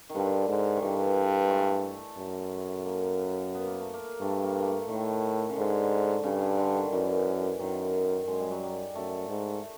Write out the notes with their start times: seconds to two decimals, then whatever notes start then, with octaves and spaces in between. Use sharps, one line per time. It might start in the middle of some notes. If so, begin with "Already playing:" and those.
0.09 D#3
0.15 G2 D3
0.49 G#2
0.76 D#3
0.82 G2 E3
1.46 G#3 A3
2.18 F#2
2.86 A#3
3.54 B3
3.67 A#3
3.81 A3
3.94 A#3
4.21 G2 A3
4.43 A#3
4.60 A#3
4.66 A3
4.89 A2 D#3
5.49 C#3
5.56 G#2 D3
6.24 G2 C#3
6.42 D3
6.58 D3
6.75 D#3
6.92 F#2 E3
7.59 F#2 D#3
8.27 F#2 G#3
8.39 G3
8.51 F#3
8.63 G3
8.95 F#2 A3
9.29 G#2
9.62 A3